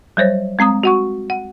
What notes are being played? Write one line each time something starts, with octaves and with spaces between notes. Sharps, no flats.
F#3 G3 C5 C#5
G#3 C4 A#5 D#6
F#4 F#5 C#6
F#5